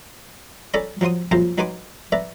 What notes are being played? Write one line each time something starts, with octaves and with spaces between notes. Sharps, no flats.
C#4 A4 D5 A#5 B5
F3 F#3 F4 C6 D#6
A#1 F#2 F3 C5 F5 A#5
F#3 D#4 B4 G#5 C6 D6
B4 D5 E5 A#5